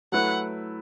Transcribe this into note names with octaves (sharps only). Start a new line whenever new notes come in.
F#3 A3 E4 B4 F#5